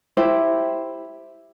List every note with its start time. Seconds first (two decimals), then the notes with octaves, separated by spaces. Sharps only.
0.17 E4 G4 C5